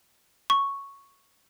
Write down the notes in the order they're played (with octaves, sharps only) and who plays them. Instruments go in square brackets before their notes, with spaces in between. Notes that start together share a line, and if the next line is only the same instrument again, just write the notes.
[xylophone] C#6